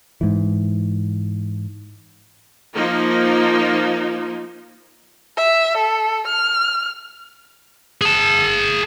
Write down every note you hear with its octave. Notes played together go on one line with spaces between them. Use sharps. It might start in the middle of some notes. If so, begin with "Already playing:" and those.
G#2 E3
F3 A#3 D#4
E5
A4
F6
G#4 A5